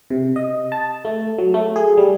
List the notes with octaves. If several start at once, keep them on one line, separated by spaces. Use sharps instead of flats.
C3
D#5
A5
A3
F#3
A3
G#4
G3